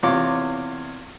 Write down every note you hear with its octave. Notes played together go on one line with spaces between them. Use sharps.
E2 C3 F4 C#5 D6